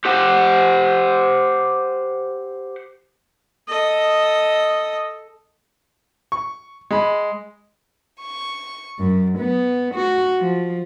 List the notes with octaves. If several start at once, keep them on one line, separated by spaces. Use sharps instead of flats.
G4 C5 F#5 G5
A4 D#5
C#6
G#3 B5
C#6
F#2
B3
F#4
F3